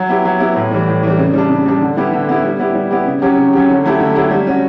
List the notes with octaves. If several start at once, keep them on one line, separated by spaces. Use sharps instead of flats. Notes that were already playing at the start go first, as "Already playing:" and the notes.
Already playing: F#3
B3 E4 G4
F#3
B3 E4 G4
A2
E3 G3
A2
E3 G3
C#3
G3 D4
C#3
G3 D4
D3
G3 B3 E4 G4
D3
G3 B3 E4 G4
G3
B3 E4 G4
G3
B3 E4 G4
C#3
F#3 C#4 G4
C#3
F#3 C#4 G4
D3
F#3 A3 E4 G4
D3
F#3 A3 E4 G4
G3
C#4 F#4